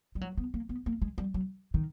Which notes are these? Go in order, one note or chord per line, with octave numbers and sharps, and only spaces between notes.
G3
F#3
B3
A#3
B3
A#3
G#3
G3
F#3
D#3